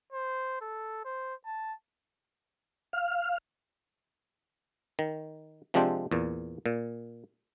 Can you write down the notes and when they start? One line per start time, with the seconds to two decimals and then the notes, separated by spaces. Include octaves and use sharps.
0.13 C5
0.61 A4
1.05 C5
1.46 A5
2.93 F5
4.99 D#3
5.74 C3 F3 G#3 C4 D4 G4
6.11 E2 A#2
6.66 A#2